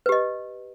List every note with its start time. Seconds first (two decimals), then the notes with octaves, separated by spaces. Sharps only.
0.06 B4
0.09 G4
0.12 D#5